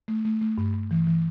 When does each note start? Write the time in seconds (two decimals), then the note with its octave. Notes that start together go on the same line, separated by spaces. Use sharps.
0.08 A3
0.25 A3
0.42 A3
0.58 G2
0.74 G2
0.91 E3
1.07 E3